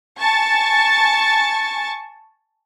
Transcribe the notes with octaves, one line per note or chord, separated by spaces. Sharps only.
G#5 A5 C#6 A6